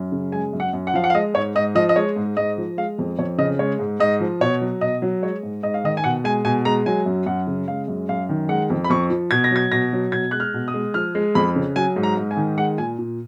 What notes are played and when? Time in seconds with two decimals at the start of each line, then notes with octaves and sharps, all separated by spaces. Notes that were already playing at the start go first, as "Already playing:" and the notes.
Already playing: F#2
0.12 C#3
0.32 G#3 G#5
0.53 F#2
0.60 F#5
0.73 F#2
0.87 F#5
0.94 F3 F5
1.04 F#5
1.10 F5
1.14 G#3 D#5
1.34 G#2 C#5
1.55 G#2 D#5
1.75 F3 D#5
1.89 D#5
1.96 G#3 C#5
2.16 G#2
2.37 G#2 D#5
2.58 F3
2.77 G#3 F5
2.99 F2
3.19 F2 C#5
3.38 C#3 D#5
3.59 G#3 C#5
3.79 G#2
4.00 G#2 D#5
4.20 F3
4.41 B2 C#5
4.61 F#3
4.81 B2 D#5
5.02 F#3
5.22 G#3 C#5
5.43 G#2
5.63 G#2 D#5
5.74 F5
5.84 D#3 D#5
5.97 G#5
6.04 B2 F#5
6.24 G#3 G#5
6.45 B2 G#5
6.65 G#3 A#5
6.86 F#3 G#5
7.06 F#2
7.26 F#2 F#5
7.47 C#3
7.68 G#3 F5
7.88 F#2
8.09 F#2 F5
8.29 D#3
8.49 G#3 F#5
8.70 F2
8.84 B5
8.90 F2 C#6
9.10 F3
9.31 B2 G#6
9.44 A#6
9.51 F#3 G#6
9.72 B2 A#6
9.93 F#3
10.12 B2 G#6
10.31 G#3 F#6
10.40 F6
10.54 B2
10.68 D#6
10.74 G#3
10.94 F3 F6
11.15 G#3
11.35 F2 B5
11.56 C#3
11.76 F#3 G#5
11.96 G#2
12.03 A#5
12.17 G#2
12.31 G#5
12.37 D#3
12.58 G#3 F#5
12.78 A#2 G#5
12.98 A#2